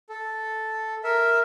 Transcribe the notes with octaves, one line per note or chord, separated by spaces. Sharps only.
A4
A#4 E5